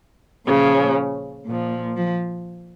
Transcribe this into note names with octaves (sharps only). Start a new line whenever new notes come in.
A#2 C#3 F3 C#4
A#2 F3
F3